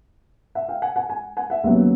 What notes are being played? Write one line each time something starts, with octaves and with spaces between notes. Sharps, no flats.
E5 F#5
F5 G5
F#5 G#5
F#5 G#5
F#5 G#5
F#5 G#5
E5 F#5
D#2 C#3 F#3 B3 E5